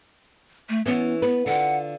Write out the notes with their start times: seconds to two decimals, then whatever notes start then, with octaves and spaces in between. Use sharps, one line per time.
0.69 A3
0.86 E3 B3 C#4
1.22 B3 B4
1.46 D3 F4 F#5